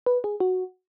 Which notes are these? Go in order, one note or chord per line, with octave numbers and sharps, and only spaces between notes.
B4
G#4
F#4